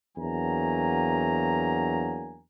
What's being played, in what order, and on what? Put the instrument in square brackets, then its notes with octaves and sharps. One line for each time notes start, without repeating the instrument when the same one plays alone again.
[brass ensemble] E2 F#3 A#3 D4 G#5 A#5